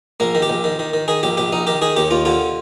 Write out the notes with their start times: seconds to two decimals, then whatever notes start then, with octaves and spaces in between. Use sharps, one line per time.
0.20 A#1 A#3
0.35 D#3
0.42 G4
0.50 A#1
0.64 D#3
0.79 D#3
0.93 D#3
1.08 D#3 G#4
1.23 A#1 G4
1.37 A#1 G4
1.52 A#1 D#4
1.67 D#3 G4
1.81 D#3 G#4
1.96 D#2 G4
2.11 D#2 F4
2.25 D3 F4